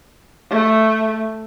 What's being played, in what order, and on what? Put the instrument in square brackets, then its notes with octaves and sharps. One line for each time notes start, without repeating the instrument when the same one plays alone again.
[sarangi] A3